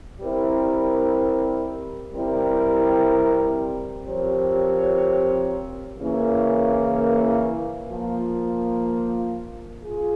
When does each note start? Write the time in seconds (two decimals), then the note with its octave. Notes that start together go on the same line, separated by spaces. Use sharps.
0.21 G3 C4 E4 A#4
2.13 C3 G3 C4 E4 A#4
4.06 F3 C4 G4 A#4 C#5
5.99 C#3 E3 A#3 C#4
7.91 F3 A#3 F4
9.84 F4 G#4